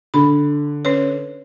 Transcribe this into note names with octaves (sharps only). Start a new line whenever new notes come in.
D3 B5
C#4 B4 C#5